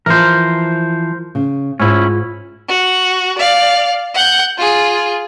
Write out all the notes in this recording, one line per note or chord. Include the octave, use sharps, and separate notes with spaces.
E3 F3 A#4 C5
C#3
G#2 C#4 E4 F4
F#4
D5 F5
F#5 G6
F4 G#4